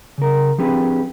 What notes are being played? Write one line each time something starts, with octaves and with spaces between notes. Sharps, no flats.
C#3 A#4
F3 C4 D4 G4 G#4 B4